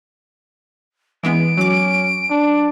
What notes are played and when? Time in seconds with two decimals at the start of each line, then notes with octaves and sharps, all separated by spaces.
1.23 E3 G#3 B3 D7
1.57 F#3 C#4 D6
2.31 D4